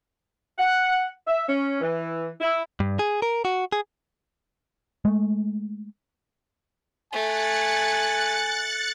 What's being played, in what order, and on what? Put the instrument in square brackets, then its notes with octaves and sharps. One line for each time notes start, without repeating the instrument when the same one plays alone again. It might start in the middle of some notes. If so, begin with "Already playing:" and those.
[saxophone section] F#5
E5
C#4
E3
E4
[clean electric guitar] G2
G#4
A#4
F#4
G#4
[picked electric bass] G#3 A3
[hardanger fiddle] A3 [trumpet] G#5 [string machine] F#6 A6 C#7